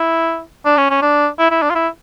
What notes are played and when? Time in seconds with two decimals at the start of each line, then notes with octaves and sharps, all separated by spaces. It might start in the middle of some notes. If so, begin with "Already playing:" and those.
Already playing: E4
0.65 D4
0.78 C#4
0.90 C#4
1.02 D4
1.39 E4
1.51 E4
1.63 D4
1.71 F4
1.75 E4